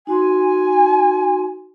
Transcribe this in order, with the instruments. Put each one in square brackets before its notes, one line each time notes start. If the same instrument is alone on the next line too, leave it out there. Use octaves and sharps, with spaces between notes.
[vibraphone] D#4 F#4 C6 [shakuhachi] G#5